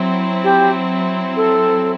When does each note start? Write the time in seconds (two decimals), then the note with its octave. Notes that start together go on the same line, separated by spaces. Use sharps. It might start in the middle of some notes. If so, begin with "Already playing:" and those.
Already playing: F#3 C4 E4
0.44 G4
1.36 A4